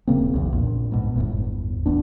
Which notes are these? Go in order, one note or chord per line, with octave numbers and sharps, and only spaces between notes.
D#1 C#3 A#3 C4
B1 E2
A#1 A#2
G#2 B2
G1 E2 A2
F1 E2 B3 D4